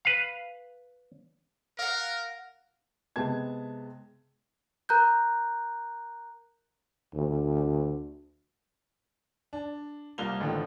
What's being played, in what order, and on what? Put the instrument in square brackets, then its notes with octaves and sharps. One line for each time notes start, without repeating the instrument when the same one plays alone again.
[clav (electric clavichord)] B4 F5
[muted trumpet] A#4 [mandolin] F5 F#5
[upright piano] C3 G#3 B3 A5 G#6
[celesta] A#4 A#5 F#6 G6
[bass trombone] D2
[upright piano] D4
C2 A#3 F4 F7 G7
A1 A2 D3 D#3 F3